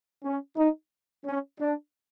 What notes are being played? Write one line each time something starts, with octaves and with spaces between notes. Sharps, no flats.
C#4
D#4
C#4
D4